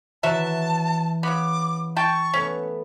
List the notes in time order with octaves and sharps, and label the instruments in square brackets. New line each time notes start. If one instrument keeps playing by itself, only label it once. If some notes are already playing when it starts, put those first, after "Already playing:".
[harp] E3 [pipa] F#3 F#4 E5 [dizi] A5
[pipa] C#3 B3 [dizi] D6
[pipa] G5 A5 [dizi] C#6
[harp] A3 B3 [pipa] C#4